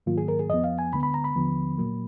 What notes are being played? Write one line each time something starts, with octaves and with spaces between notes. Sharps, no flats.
G#2 D#3 F#3 A#3 F4
G#4
A#4
G#4
F2 F3 B3 D#5
F5
G#5
D2 D3 G#3 B3 B5
B5
A#5
B5
D#2 D3 F3 B3
A#2 F#3 A#3